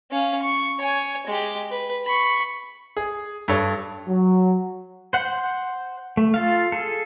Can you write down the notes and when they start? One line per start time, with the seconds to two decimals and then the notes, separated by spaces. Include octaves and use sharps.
0.11 C#4 F5
0.42 C#6
0.80 C#5 G#5
1.27 G#3 G4
1.71 B4
2.05 B5 C#6
2.97 G#4
3.48 G2 A4 C#5
4.07 F#3
5.13 C5 F#5
6.17 A3
6.34 F4 A4 F5
6.72 G#4 A4